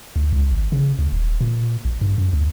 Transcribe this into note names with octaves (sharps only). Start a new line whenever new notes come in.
D2
C#2
G#1
C#3
D2
D#1
A#2
A#1
G2
F#2
D2